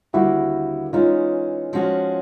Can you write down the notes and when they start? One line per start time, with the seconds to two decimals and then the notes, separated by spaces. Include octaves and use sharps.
0.13 D#2 D3 G3 A#3 E4 F#4
0.93 E3 G#3 C#4 D#4 F4
1.73 F3 G#3 C#4 F#4